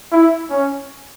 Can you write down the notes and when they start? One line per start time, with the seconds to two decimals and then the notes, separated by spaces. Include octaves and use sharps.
0.12 E4
0.50 C#4